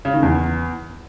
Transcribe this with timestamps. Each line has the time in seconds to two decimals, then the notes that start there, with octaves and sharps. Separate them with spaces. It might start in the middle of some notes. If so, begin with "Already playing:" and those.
0.05 C#3
0.14 D#3
0.23 E2